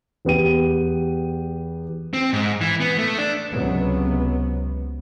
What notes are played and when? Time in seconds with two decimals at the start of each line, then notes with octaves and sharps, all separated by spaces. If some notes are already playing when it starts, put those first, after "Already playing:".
0.25 E2 B3 G4 D#7
2.14 C4
2.33 G#2
2.61 E3
2.81 B3
2.99 A3
3.18 D4
3.52 C#2 C3 F#3 B3